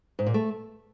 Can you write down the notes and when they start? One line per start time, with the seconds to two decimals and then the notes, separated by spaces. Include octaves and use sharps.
0.19 G#2
0.26 A#2
0.34 A3